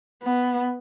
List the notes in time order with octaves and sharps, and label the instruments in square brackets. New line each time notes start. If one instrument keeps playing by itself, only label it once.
[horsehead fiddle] B3